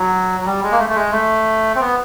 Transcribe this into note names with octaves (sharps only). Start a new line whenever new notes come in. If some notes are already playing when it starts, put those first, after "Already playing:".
Already playing: F#3
F#3
G3
G#3
A#3
A3
A3
G#3
A3
C4
B3